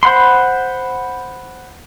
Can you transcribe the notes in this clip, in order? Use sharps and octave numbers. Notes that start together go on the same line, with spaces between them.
C5 F#5 B5 C6